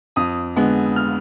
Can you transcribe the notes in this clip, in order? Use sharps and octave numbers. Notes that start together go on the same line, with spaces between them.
F2 D#6
D3 G#3 B3
F6